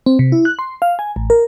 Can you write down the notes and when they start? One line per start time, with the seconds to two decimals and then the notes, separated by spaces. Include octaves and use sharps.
0.06 C4
0.19 C3
0.32 E4
0.45 F#6
0.59 C6
0.82 F5
0.99 G#5
1.16 A1
1.30 A#4